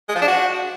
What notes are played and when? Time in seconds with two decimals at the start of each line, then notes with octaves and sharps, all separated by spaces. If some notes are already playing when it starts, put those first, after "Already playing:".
0.09 G#3
0.15 F3
0.22 D4
0.28 F#4